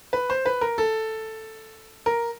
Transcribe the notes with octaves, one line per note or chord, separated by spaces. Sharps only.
B4
C5
B4
A#4
A4
A#4